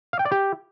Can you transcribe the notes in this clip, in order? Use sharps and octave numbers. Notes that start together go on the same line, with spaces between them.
F5
G5
D5
G4